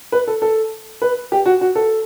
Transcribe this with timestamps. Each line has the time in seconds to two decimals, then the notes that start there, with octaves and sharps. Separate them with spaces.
0.12 B4
0.27 A4
0.42 A4
1.02 B4
1.32 G4
1.46 F#4
1.61 F#4
1.75 A4